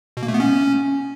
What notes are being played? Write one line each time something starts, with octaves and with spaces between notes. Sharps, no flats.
B2
A#3
A3
B3
C#4